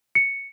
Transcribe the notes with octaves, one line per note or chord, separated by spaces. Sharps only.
C#7